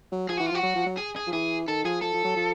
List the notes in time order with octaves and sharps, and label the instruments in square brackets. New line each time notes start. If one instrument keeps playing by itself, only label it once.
[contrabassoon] F#3
[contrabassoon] F3 [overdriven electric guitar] G#4
[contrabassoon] E3 [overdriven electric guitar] F#4
[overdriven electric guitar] F4
[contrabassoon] F3 [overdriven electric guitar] F#4
[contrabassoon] F#3
F3
F#3
[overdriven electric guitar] G#4
G#4
[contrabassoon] F3
[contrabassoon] E3 [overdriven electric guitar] G#4
[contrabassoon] D#3 [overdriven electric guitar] A4
[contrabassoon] F3 [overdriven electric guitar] G#4
[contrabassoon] F3 [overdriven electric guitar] A4
[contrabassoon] F3
F#3
F3